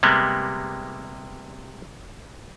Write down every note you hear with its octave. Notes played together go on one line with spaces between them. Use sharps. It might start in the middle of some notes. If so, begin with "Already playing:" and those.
C3 G3 G#3 A#3 B3